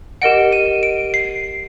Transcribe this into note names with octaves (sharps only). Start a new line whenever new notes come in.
G4 A#4 D#5 F#5 D7
D#7
D7
C7